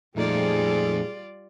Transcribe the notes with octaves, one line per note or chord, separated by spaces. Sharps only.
F2 A#2 G3 A3 D#4 F4 G#4 D5